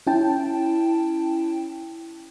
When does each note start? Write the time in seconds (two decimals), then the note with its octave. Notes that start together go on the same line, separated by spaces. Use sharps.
0.07 C#4 E4 G5 A5